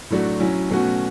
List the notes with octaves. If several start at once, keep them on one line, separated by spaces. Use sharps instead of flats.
A2 F#3 A3 D4 F#4
F#3 C#4 E4
B2 F#3 A3 C#4 F#4